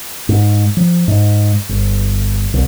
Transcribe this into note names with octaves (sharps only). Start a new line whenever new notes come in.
G#2
F3
G#2
G1
C2